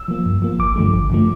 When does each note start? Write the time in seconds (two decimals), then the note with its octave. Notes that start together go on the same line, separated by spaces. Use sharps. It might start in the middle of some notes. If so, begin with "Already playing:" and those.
Already playing: E6
0.08 F3 A#3
0.26 G2
0.42 F3 A#3
0.59 A1 D6
0.76 G2 D3 F3 A3
0.94 A1
1.10 G2 D3 F3 A3